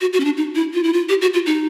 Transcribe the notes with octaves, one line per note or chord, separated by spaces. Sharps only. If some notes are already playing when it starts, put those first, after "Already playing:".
F#4
F#4
C#4
D4
D#4
E4
F4
E4
F4
G4
F#4
F4
D#4